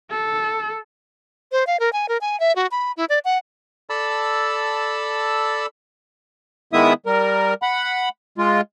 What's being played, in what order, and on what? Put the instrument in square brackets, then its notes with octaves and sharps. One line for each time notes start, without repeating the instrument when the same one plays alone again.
[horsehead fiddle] A4
[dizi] C5
F5
A#4
G#5
A#4
G#5
E5
F#4
B5
E4
D5
F#5
[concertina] A4 D5 A5 B5 E6
[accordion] D#3 G#3 B3 E4 E5 D#6
G3 A#4
F#5 B5
G#3 F4